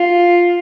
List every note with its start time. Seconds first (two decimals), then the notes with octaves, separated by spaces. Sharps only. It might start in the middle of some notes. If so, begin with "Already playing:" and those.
Already playing: F4